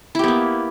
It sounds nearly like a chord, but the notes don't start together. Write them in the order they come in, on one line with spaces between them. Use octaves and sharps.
E4 G4 B3 A#3